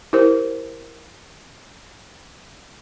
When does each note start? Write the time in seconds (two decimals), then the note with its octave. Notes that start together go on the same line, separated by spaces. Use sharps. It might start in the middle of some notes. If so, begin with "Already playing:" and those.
0.13 E4 G4 A#4 C5